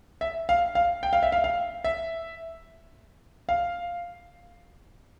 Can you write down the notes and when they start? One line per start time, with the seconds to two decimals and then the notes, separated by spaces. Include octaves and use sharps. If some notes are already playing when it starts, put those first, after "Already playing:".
0.21 E5
0.49 F5
0.75 F5
1.03 G5
1.13 F5
1.23 E5
1.32 F5
1.44 F5
1.84 E5
3.49 F5